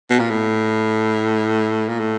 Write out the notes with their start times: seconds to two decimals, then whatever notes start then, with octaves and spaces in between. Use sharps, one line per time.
0.10 B2
0.19 A#2
0.30 A2
1.89 A#2
1.99 A2